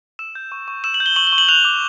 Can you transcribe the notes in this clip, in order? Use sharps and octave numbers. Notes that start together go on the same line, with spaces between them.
E6 E7
G6
C#6
C#6
E6 E7
F#7
G6
G7
C#6 F#7
G7
C#6
F#7
F#6 F7
D6